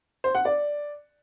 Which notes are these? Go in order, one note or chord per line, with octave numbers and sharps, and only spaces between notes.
C5
F#5
D5